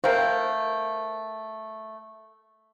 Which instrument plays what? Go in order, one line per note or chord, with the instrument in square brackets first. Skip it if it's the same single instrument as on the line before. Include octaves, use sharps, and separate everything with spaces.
[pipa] A3 A#4 [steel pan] C5 F5 G5